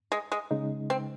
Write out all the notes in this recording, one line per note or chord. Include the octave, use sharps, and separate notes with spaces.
G#3
G#3
C#3 G#3 D#4
C4